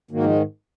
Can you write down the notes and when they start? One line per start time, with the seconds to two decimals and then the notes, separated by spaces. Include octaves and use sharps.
0.11 G#2 D#3 F#3 A#3
0.24 F3 G#3